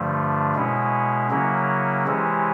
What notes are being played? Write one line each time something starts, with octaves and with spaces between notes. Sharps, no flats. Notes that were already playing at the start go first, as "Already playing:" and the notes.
Already playing: G2 D3 F3 A3
B2 G#3 C#4 E4
C#3 F#3 A#3 C#4 E4
C3 E3 G#3 C#4 E4